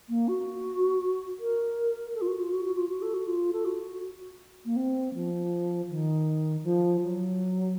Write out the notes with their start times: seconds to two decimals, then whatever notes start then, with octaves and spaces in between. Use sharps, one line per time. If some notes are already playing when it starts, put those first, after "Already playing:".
0.09 A#3
0.28 F#4
1.39 A#4
2.15 A4
2.21 F4
2.27 F#4
2.39 F4
2.52 F#4
2.65 F#4
2.77 F4
2.89 F#4
3.02 A4
3.14 F#4
3.27 F4
3.53 A4
3.65 F#4
4.65 A#3
4.76 C4
5.14 F3
5.89 D#3
6.63 F3
7.01 F#3